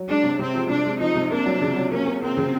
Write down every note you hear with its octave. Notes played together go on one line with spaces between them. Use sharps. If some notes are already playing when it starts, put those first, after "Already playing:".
Already playing: F#3
G#3 D4
C3
C3 C4
F3
C3 D4
G#3
F3 D#4
C3
A#3 D4
F#3
C#3
F#3
A#3 C#4
A#3
A#3 C4
C#3